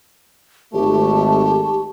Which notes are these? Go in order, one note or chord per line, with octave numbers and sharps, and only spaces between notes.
G#1 A3 G4 A5 C#6